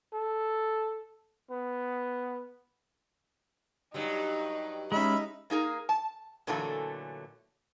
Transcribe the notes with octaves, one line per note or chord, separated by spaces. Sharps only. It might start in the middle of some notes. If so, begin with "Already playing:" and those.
A4
B3
G2 F#3 G3 D#4
G#3 C#4 D#4 E5 B5
A#3 D#4 G#4 A#4
A5
A#2 D3 E3 F#3 A3 A4